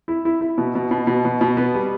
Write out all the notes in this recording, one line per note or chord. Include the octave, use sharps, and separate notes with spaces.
E4
E4
E4
B2
B2
B2
B2
B2
B2
B3
G3